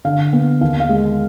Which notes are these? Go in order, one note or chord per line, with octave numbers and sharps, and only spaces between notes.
D3 F5
B3
D#2 F5
F5
G#3